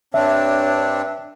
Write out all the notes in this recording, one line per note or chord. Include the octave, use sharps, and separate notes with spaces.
G2 C4 D4 C#5 E5